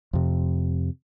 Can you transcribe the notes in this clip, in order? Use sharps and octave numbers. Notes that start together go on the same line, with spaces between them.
F2 C3